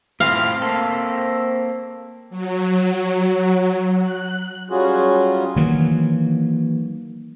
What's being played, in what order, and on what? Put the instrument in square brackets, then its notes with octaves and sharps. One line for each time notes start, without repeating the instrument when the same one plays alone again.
[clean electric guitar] A2 C4 F4 [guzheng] F5
[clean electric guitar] A#3 A4 [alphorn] C4
[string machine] F#3
F#6
[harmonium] F#3 G3 C#4 F4 F#4 G#4
[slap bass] D#3 E3 F#3 A#3